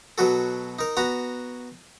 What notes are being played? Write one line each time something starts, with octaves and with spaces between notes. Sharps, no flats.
B2 F#3 F#4 A4
D#4 A#4
B3 F#4 A#5